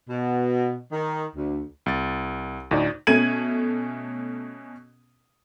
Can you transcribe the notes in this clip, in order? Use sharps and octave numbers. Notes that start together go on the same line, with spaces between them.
B2
D#3
D2
C2 A6
D2 A2 D#4 D5
B2 A3 C#4 G#6 D#7 F#7